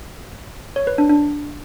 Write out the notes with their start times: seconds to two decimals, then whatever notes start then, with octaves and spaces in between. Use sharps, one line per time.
0.76 C#5
0.87 B4
0.98 D4
1.09 D4